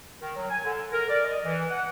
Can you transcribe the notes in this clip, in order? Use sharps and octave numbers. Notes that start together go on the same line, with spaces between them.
D#3
F#3
G#5
D3
A#4
D5
D#5
E3
F#5